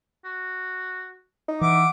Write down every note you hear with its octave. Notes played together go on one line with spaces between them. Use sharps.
F#4
D#4
E3 E5 F#5 D6